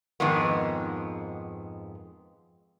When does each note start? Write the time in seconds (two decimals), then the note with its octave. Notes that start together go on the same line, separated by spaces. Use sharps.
0.20 F2 G#2 D#3 G#3 B3